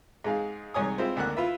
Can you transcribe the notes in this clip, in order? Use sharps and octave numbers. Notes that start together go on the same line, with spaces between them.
G#2 G#3 G#4 F5
C2 G#2 C#5 G#5 D#6
G#3 C4 E4 F4 C5
G#1 D2 A#3 F#5 F#6
E4 F4 B4 E5